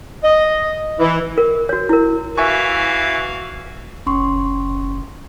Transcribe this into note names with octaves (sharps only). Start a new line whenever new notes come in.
D#5
E3
A#4
F#4 C#5
E4 A#4
E3 F#4 E5 F5 G#5 C#6
F#1 C#4 C6 C#6